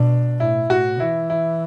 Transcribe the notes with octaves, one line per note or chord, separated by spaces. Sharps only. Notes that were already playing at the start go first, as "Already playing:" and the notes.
Already playing: B2 D4
A2 E4
A2 F#4
E3 E4
E4